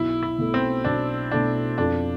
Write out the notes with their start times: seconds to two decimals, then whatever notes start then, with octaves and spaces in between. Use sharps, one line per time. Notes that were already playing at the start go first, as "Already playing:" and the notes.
Already playing: B1 E4
0.23 E4
0.38 B2 A3
0.54 C4
0.84 B1 D4
1.31 B2 A3 D4
1.78 F2 D4